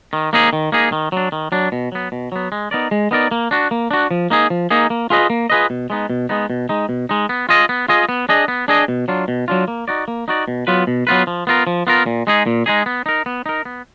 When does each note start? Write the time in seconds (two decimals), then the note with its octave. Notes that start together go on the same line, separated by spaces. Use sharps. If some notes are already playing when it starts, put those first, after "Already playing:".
0.13 D#3
0.33 A#3 D#4 G#4
0.53 D#3
0.72 A#3 D#4 G#4
0.92 D#3
1.12 F#3 D4
1.32 D#3
1.52 F#3 D4
1.72 B2
1.92 F#3 B3
2.12 B2
2.32 F#3 B3
2.52 G#3
2.71 B3 D#4 A#4 D5
2.91 G#3
3.11 B3 D#4 A#4 D5
3.31 A#3
3.51 D4 F#4
3.71 A#3
3.91 D4 F#4
4.11 F3
4.30 A#3 D#4 G#4
4.50 F3
4.70 A#3 D#4 G#4
4.90 A#3
5.10 F4 G#4 B4 D#5
5.30 A#3
5.50 F4 G#4 B4 D#5
5.70 B2
5.90 G#3 B3 D#4
6.10 B2
6.29 G#3 B3 D#4
6.50 B2
6.69 G#3 D#4
6.89 B2
7.09 G#3 D#4
7.29 B3
7.49 F4 G#4 D#5
7.69 B3
7.88 F4 G#4 D#5
8.09 B3
8.29 D4 G#4 D#5
8.48 B3
8.68 D4 G#4 D#5
8.88 B2
9.08 F#3 D4 F4
9.28 B2
9.48 F#3 D4 F4
9.68 A#3
9.88 D#4 F#4 D5
10.08 A#3
10.28 D#4 F#4 D5
10.48 B2
10.67 F#3 B3 F4 B4
10.87 B2
11.07 F#3 B3 F4 B4
11.27 F3
11.47 B3 F4 A#4
11.67 F3
11.87 B3 F4 A#4
12.06 A#2
12.27 G#3 D#4 G#4
12.46 A#2
12.66 G#3 D#4 G#4
12.86 B3
13.06 D#4 A#4
13.26 B3
13.46 D#4 A#4
13.65 B3